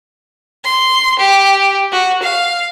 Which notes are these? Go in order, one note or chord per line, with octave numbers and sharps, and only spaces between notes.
C6
G4
F#4
F5